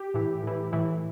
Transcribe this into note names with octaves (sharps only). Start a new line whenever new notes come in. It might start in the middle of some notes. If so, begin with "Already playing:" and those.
Already playing: G4
A2 E3
A2 E3
A2 E3